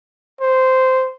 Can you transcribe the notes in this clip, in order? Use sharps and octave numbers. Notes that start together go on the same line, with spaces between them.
C5